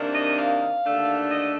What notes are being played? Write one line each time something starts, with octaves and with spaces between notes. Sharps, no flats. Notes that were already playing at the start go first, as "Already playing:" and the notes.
Already playing: C3 D#3 A#3 D4
D#5
F5
D#2 D3 A3 D4
D#5